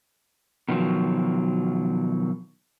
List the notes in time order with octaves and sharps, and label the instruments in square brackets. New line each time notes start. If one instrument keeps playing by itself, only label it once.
[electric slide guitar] B2 D#3 F3 F#3